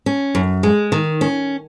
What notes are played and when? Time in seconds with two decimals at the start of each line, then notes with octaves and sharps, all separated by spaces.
0.06 C#4
0.35 F#2
0.63 G#3
0.92 D#3
1.21 C#4